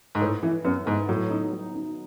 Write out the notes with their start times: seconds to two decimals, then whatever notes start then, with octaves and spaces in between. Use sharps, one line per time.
0.15 G#2
0.20 A2 B4
0.43 E3 E4
0.65 F#2 B3
0.86 G#2 B3
1.08 A2 F#3
1.30 D#4
1.53 F#3
1.74 D#4